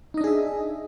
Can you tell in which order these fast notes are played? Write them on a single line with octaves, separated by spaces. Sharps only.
D#4 D#5 D4 G#4 E5